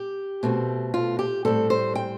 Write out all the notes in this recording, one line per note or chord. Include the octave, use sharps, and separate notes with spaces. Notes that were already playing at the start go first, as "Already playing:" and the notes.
Already playing: G4
B2 A3 C4
F4
G4
A2 G3 C4 A4
C5
G5